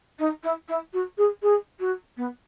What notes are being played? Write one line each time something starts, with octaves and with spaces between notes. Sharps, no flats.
D#4
E4
E4
F#4
G#4
G#4
F#4
B3